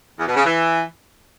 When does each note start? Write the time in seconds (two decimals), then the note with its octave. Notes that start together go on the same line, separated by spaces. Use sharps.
0.19 E2
0.28 B2
0.36 C#3
0.45 E3